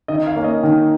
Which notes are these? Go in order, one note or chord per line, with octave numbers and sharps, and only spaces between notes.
D#3 D#5
F5
A#3 C#4
D#5
D#3